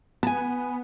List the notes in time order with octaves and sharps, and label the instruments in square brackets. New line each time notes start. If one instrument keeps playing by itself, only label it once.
[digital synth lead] B3 [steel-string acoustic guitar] G#5 A5